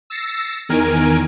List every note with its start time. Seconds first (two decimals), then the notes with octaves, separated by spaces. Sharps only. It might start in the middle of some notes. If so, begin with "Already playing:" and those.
0.10 E6 A6 A#6 C7 C#7
0.69 E2 D#3 A#4 G#5 D7